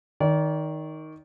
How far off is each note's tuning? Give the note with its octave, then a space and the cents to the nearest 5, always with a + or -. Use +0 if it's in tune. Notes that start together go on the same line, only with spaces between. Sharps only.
D#3 +10 D5 -35